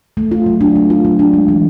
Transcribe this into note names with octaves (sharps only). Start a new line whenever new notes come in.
A3
F4
F#3
D4
A3
F4
F#3
D4
G#3
E3